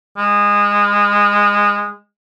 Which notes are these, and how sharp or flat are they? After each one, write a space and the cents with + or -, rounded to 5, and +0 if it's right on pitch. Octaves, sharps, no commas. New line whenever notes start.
G#3 -20